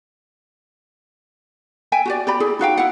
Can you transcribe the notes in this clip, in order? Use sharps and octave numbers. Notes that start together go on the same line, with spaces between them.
E5 G5 G#5
F#4 G4 D5
G4 D5 B5
E4 G#4
D#4 F#4 F5 G5
E4 F#5